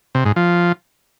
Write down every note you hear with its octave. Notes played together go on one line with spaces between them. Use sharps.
C3
G#2
F3